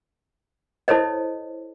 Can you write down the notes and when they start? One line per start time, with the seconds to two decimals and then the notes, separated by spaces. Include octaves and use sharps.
0.88 E4 A4 C5 C#5 D#5